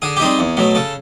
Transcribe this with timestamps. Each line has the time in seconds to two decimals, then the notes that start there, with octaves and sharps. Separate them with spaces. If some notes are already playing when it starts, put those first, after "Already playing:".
0.02 D3 G#4
0.16 G4
0.20 G3 C4 D#4 G#4
0.39 E2
0.57 B2 F#3 A3
0.75 C#3 A4